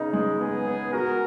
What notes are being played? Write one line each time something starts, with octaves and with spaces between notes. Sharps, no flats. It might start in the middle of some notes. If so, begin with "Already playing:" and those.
Already playing: C#3 B3 D#4
G#3
B3 G#4
B3
F#4 A#4